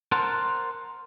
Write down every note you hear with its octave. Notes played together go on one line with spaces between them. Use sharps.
A#4 C5 F#5 A5